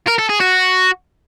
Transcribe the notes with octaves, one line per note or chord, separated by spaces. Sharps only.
A#4
A4
G#4
F#4